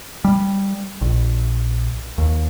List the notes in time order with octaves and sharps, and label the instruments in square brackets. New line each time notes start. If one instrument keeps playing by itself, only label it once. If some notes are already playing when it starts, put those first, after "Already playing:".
[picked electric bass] G3
A#1
D#2